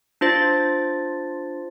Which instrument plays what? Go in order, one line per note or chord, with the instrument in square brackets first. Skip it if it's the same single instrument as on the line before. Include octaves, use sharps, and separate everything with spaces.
[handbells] D4 F4 C5 A6